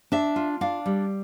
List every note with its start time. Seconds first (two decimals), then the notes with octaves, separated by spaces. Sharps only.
0.12 D4 E5
0.36 F4
0.61 D4 F5
0.86 G3